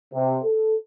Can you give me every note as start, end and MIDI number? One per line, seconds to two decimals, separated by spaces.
0.14 0.37 48
0.44 0.75 69